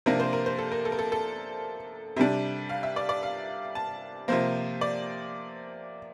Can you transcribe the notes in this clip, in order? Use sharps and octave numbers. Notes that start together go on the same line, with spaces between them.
C3 F3 A#3 D4 A#4
C5
A#4
C5
A4
A#4
A4
A#4
A4
A4
C3 G3 D4
F5
E5
D5
D5
F5
A5
C3 F3 A#3 C5
D5